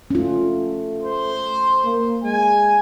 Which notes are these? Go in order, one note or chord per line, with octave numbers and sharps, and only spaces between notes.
A3 C#4 F4
C5
A#3
G#3 G#5